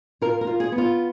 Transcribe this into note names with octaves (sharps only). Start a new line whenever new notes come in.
F4 A#4
A#4
F4
G#4
B3
F4